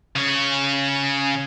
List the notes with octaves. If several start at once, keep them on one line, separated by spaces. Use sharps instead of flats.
C#3 C#5